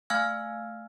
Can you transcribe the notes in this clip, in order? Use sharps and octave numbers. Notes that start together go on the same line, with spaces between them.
A3 F5 G#5 E6 F6 G#6